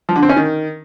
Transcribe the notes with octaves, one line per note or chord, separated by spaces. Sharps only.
F3
D3
C4
C#4
D#3